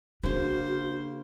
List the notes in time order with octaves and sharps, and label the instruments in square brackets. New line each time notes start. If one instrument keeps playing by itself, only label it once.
[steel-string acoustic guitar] C#3 A#3 [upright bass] D4 [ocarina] F#4 [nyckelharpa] C5